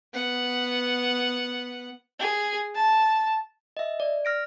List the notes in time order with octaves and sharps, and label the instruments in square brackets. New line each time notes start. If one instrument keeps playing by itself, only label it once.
[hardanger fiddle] B3 F#5
[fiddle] G#4
A5
[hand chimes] D#5 E5
D5
F6 A#6 D7